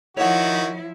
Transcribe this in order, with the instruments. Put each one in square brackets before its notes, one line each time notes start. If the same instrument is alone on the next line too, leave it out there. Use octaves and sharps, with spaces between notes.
[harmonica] D#3 F#4 [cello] F3 E4 [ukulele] C#5 F#5